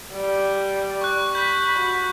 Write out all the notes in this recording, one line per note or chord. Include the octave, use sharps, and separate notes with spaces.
G3
C#6 F#6
B5 G6 B6
F#4